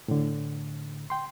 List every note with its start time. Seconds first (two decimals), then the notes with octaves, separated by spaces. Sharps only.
0.08 A2 D3
1.10 G5 C6